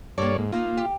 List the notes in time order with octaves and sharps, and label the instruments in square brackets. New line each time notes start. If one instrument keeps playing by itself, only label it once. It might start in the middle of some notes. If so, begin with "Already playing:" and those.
[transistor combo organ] G2 C#5 D5 [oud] A#3 A4
[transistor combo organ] G#2
[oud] A#3 D#4 [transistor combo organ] F4
[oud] G4